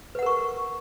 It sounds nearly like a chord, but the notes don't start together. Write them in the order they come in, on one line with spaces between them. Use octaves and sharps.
B4 F#5 A#4 C#6